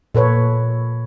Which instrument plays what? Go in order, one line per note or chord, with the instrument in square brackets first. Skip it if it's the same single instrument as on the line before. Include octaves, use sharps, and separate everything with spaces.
[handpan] A#2 A4 B4 C#5